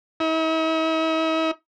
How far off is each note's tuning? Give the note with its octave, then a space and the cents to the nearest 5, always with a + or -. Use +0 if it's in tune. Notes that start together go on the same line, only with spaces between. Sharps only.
E4 -45